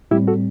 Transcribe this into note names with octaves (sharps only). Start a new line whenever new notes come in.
A2 G3 C4 E4 G4
F#4 A4